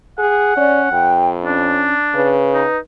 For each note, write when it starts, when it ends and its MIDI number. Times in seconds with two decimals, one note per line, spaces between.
0.19 0.54 68
0.19 1.16 78
0.57 0.88 61
0.57 0.80 74
0.92 1.94 41
0.92 1.30 79
1.44 1.95 61
1.44 2.35 62
2.15 2.65 49
2.15 2.79 71
2.54 2.78 63